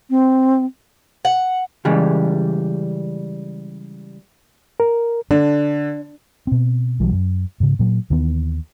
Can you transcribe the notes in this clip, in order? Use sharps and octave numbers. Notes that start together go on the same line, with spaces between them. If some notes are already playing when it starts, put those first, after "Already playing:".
C4
F#5
C#3 E3 G3 G#3
A#4
D3 D4
B2 C4
B1 E3 F#3 G3
F#2
G#2 C#3
A#2 F#3
D#2 D#3 E3 B3